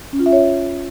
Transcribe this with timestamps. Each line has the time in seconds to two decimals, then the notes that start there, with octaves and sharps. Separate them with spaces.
0.13 C#4
0.19 F4
0.26 E5
0.33 C#5